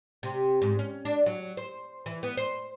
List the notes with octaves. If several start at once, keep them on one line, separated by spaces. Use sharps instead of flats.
C3
G#2
C#4
D4
F#3
C5
E3
B3
C5